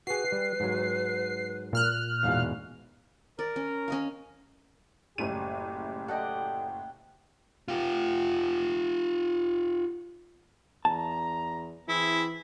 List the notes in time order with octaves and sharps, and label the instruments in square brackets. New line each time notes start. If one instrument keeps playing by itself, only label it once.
[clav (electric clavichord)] F#4 G#4 [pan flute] B4 [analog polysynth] C7
[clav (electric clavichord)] G3
G#2 F#3
[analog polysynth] A#2 F6 F#6
[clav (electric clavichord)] E2 G#2 B2 [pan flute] F5
[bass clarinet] A#4 [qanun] D5
[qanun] C#4
C#4 D#5 F5
[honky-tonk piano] F#1 A2 D#7 [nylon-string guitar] C#3 G3 [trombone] G4
[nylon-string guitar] A4 D5 D#5 [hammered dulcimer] F#5 G5 A#5
[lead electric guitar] F4 G4
[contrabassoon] E2 [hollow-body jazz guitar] A5 [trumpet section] A#5
[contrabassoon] E3 [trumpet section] C4 G#4 [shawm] E4